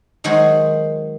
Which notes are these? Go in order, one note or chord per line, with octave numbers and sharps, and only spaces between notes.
D#3 F#3 G#3 F#4 C5